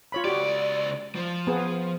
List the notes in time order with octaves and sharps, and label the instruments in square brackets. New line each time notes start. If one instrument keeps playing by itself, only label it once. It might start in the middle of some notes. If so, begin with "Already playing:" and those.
[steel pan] F4 C#5 B5
[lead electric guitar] C#2 D5 [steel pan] F#4 G4
[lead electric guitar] F3
[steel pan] B3 G#4 C5